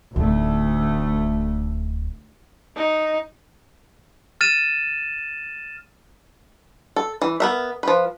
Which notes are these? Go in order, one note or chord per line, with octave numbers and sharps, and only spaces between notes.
D1 D2 A3 D#4
D#4
F6 A6 D#7 E7
A4
E3
B3 A#4 E5
F3 B4